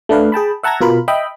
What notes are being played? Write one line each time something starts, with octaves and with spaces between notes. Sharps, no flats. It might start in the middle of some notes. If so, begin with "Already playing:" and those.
A3 D4 B4 F5
G#4 G5 A5 B5
E5 F#5 A5 A#5 G#6 A#6
B2 F4 A#4 B5
D#5 E5 G5 B5